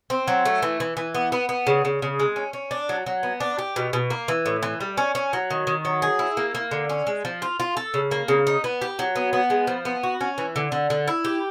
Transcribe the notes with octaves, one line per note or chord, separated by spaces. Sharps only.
C4
F#3
A3
E3
E3
E3
B3
B3
B3
C#3
C#3
C#3
G#3
C#4
C#4
D4
F#3
F#3
B3
D4
G4
B2
B2
A#3
E3
A2
E3
G3
C#4
C#4
F#3
D#3
D#3
F#3
G#4
E4
A#3
A#3
D3
C#4
G#3
F3
F4
F4
A4
C#3
A#3
C#3
D#4
B3
G4
F#3
B3
B3
G#3
F3
B3
F#4
C#4
E3
D3
D3
D3
E4
G4